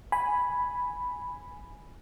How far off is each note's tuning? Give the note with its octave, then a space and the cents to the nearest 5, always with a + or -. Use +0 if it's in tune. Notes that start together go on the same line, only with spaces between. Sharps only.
G#5 +0 B5 +0